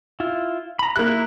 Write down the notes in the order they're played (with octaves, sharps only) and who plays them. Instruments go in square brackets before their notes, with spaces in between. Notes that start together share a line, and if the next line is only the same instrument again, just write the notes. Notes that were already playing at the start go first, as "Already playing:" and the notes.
[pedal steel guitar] E4 F4
A#5 B5
[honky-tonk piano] A#3 F#6 [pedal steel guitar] E4